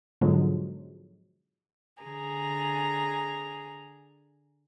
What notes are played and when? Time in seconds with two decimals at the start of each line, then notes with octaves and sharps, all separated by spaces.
0.21 G#2 B2 D3 F3 F#3 G#3
2.03 D3 G#4 A#5